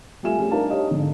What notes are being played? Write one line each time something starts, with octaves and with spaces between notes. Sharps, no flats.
G3 A3 F4 E5 G#5 E7
G3 A3 C#4 G#4
D4 D#4 A#4 F5 A5
G4 C#5 D#5 F5
G#2 D3